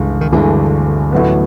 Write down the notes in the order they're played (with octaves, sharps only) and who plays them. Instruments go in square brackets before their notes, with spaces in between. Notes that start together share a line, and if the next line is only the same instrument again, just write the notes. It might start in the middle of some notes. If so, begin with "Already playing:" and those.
Already playing: [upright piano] G1 G2 E3 G#3 [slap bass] C#2
[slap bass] D#3
[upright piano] G1 G2 E3 G#3 [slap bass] D2 D3
[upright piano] A1 A2 F#3 B3